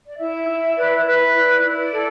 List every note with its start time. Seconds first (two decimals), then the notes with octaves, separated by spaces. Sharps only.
0.06 D5
0.19 E4 E5
0.48 E4
0.77 B4 D5
0.96 E5
1.05 B4
1.35 E4 D5
1.63 E4
1.92 A4